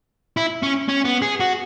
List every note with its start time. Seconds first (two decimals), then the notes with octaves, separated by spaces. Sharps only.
0.37 E4
0.63 C#4
0.88 C#4
1.05 B3
1.22 G#4
1.40 F#4